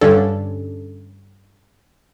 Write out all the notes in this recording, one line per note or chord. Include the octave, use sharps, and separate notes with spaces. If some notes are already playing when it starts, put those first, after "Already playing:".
G2 D3 C#4 D4 A4